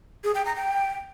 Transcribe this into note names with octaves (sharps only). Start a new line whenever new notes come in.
G#4
G5
A#5
G5